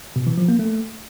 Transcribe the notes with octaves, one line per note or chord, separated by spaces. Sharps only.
B2
E3
F3
A#3
A3